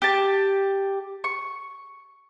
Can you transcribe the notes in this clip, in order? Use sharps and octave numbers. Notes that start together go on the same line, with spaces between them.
G4 A5
C#6